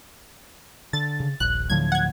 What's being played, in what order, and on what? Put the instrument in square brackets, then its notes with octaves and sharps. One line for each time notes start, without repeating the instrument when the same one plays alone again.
[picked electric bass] D3 [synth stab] A6
[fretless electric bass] C#3
[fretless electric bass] D#1 [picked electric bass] A#1 [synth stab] F#6
[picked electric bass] D2 A2 F3 [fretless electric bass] D3 F#3 [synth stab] G#6
[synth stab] F#5 G#6